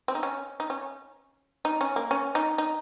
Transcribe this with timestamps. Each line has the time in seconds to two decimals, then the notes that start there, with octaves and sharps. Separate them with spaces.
0.08 C4
0.15 D#4
0.23 C#4
0.60 D#4
0.70 C#4
1.65 D#4
1.81 C#4
1.96 A#3
2.11 C#4
2.35 D#4
2.58 D#4